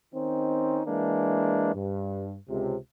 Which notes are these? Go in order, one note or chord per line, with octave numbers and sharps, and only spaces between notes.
D#3 C4 C#4 D#4
E3 G#3 A#3 D4
G2
C#2 C3